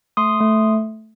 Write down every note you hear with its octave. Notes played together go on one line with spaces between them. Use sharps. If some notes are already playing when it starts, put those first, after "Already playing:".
A3 C6 D#6
A3